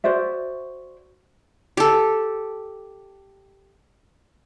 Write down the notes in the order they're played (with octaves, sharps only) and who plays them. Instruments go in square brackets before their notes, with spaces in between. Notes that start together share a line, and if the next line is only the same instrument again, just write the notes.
[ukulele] F#4 C5 D5 E5
[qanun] G4 A4